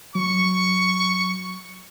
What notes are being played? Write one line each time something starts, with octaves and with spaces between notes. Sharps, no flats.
F#3 C#6